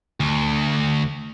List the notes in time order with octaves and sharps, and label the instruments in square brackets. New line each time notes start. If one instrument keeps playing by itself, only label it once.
[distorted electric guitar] D2